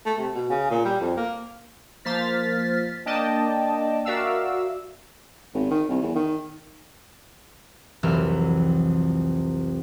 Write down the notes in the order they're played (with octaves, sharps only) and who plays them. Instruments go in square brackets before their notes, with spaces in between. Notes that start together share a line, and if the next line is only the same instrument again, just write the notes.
[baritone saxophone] A3
C3
B2
C#3
A#2
G3
F2
A#3
[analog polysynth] F3 A#3 C5 F6 A6 B6
A#3 D4 D5 D#5 G5 A5
F#4 A#4 D5 E5 F5 E6
[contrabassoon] G#1
D#3
C2
E2
D#3
[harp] F1 C2 E3 F#3 E5 F6